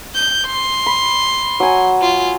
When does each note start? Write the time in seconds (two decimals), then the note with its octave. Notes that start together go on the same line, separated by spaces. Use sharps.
0.15 G6
0.46 C6
0.86 B5
1.60 F#3 G#5
2.02 F4